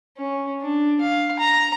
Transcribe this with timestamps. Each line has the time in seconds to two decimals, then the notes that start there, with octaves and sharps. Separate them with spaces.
0.17 C#4
0.62 D4
1.01 F5
1.39 A#5